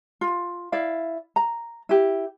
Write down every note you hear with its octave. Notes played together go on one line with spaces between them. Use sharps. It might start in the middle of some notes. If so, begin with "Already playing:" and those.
F4
E4 D5 F5
A#5
E4 G4